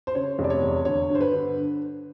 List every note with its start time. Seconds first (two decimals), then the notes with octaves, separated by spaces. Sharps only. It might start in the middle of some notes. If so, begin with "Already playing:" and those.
0.07 C5
0.15 C#3 C#5
0.39 F1
0.44 D5
0.50 C#5
0.62 E2
0.85 D3 C#5
1.10 G2
1.15 C5
1.21 B4
1.33 D3